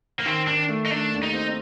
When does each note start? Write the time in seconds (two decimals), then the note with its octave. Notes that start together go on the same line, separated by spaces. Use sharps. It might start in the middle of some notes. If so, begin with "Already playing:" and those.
0.20 A#3
0.25 D#3 C4
0.47 D#3 D4
0.69 A3
0.86 D#4
0.91 A3 D4
1.12 D#2
1.23 D#4
1.33 C4